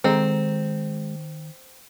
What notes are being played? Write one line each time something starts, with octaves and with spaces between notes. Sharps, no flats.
D#3 G#3 C4 A4 A#5